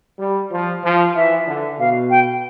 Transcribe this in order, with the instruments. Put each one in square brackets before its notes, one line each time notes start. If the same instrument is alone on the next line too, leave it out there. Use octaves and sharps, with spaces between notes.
[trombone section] G3
F3
F3
[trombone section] E3 [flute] E5
[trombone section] D3
[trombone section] B2 [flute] F5
[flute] G5